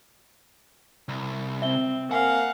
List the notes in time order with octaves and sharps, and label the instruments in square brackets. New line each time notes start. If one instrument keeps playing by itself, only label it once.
[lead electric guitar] C2
[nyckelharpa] C4 [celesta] E5 G7
[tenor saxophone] A#3 [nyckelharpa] F5 [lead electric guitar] F#5 [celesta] G#5